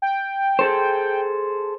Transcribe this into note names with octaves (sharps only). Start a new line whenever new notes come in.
G5
G#4 A4 C5